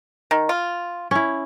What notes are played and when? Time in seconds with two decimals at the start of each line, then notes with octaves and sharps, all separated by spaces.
0.31 D#3
0.49 F4
1.11 C#4 E4